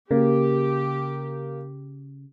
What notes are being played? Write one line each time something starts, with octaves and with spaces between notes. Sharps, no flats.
C#3 A#3 G4